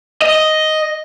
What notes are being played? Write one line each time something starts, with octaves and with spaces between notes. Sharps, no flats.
D#5